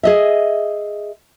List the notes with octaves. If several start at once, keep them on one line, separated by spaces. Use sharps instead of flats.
G#4 D#5 E5